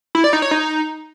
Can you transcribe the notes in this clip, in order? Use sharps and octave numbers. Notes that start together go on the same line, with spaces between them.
E4
D5
D#4
C#5
D#4